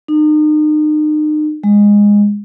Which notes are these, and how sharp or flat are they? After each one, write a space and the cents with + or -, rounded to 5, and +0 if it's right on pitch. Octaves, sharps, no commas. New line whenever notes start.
D#4 -35
G#3 -15